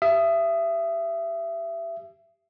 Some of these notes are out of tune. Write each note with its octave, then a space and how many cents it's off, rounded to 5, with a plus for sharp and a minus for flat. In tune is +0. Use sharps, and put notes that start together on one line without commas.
G4 +0 E5 +25 D#6 +0